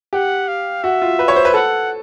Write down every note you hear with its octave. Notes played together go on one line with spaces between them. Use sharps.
G4 F#5
F5
F#4 E5
F4
B4
C#5
C5
B4
A4 F#5